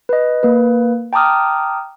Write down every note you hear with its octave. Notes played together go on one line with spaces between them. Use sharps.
B4 D#5
A#3 B4
G5 A5 A#5 D6 D#6 F6